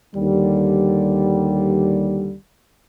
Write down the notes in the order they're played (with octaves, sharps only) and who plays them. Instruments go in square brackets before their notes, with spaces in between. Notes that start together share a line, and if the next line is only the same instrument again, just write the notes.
[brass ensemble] D#2 D3 G3